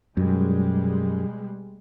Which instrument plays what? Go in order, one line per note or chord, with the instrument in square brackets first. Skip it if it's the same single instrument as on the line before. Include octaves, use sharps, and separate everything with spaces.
[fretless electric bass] F#2 [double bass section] B2 G3 G#3